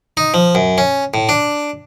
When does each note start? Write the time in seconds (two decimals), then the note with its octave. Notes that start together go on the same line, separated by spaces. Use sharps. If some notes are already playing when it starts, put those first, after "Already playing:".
0.17 D#4
0.34 F3
0.55 F#2
0.78 C#4
1.14 A2
1.29 D4